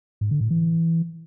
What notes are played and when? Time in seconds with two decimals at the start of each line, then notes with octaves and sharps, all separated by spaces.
0.21 G#2
0.31 D3
0.41 A2
0.50 E3